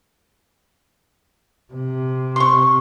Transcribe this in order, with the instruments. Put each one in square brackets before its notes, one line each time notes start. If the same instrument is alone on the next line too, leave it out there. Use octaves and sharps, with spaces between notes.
[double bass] C3
[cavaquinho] C6 C#6